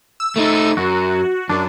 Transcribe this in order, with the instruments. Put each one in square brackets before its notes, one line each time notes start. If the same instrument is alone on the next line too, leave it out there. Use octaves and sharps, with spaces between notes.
[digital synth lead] E6
[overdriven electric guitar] A3 D#4
[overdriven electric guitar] F#2 [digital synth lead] F#4
[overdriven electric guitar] F#2 [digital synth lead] D4